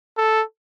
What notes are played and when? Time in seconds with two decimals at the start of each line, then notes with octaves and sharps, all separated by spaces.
0.18 A4